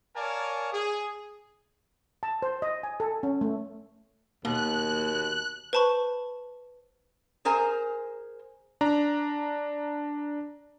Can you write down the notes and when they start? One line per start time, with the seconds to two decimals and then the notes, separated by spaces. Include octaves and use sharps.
0.16 A#4 C#5 D5 F5 G#5 A5
0.72 G#4
2.23 A5
2.42 C5
2.62 D#5
2.83 G#5
3.00 A4
3.23 C#4
3.41 A3
4.45 D#2 B2 A#3 F#6
5.73 B4 C5 A5 B5 C#6
7.45 G#4 A#4 C5 G#5 A#5
8.81 D4 A#5